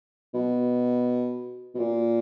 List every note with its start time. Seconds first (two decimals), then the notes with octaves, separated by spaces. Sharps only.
0.34 B2
1.74 B2
1.79 A#2